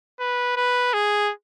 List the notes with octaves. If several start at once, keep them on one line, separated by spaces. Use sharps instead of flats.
B4
B4
G#4